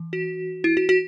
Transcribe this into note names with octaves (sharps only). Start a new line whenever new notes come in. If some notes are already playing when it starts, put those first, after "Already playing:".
Already playing: E3
F#4
E4
F#4
F#4